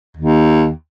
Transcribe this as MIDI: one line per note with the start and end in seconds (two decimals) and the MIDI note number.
0.17 0.70 39